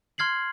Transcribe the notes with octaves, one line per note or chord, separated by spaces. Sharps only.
C6 F6 G#6 C7 F#7